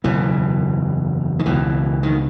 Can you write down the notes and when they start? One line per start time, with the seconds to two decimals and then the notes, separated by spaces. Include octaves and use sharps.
0.04 F#1 E2 B2 E3
1.39 D#3
1.46 C#2 B2 E3
2.03 D#3